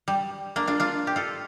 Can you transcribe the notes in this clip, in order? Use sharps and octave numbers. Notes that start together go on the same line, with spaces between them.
G3
A#3 D4
D4 F4
D4 F4
G4
F4 A4